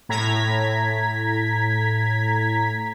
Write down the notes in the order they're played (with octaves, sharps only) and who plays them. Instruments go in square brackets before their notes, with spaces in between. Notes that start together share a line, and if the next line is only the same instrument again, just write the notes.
[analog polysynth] A2 A#5 G#6 B6